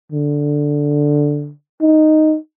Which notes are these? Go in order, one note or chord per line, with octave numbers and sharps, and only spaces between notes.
D3
D#4